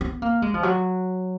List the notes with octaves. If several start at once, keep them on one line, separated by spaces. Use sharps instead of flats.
B3
A#3
G#3
F3
F#3